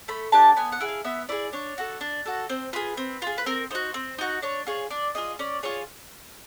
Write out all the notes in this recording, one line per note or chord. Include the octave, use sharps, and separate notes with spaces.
A3 B5
D4 G4 A5
B3 G#5
F#5
E4 G#4
F5
B3 E5
E4 G#4 D5
D4 C#5
F#4 A4
D4
F#4 A4
C4 C5
F4 G#4 B4
C4
F4 G#4
B4
C4 A#4
D#4 F#4 C5
C4
D#4 F#4
D4 C#5
F4 G#4 C#5
D4 D5
F4 G#4 D#5
C#4 D5
F4 G#4 C#5